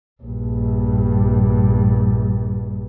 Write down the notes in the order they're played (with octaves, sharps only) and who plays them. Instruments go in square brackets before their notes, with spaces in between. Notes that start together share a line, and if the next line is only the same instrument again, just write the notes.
[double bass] A#1 G2